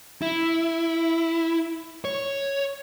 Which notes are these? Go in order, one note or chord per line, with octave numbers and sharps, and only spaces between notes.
E4
C#5